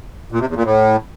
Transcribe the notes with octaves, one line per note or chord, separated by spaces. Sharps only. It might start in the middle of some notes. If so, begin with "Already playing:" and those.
A#2
C3
E2
A#2
A2